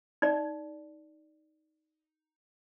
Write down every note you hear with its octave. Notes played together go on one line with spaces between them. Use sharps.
D#4 D5